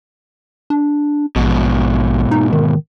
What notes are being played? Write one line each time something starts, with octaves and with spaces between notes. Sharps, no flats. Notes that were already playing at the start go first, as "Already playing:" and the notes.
D4
A#1 G#2 B2
D#4
D#3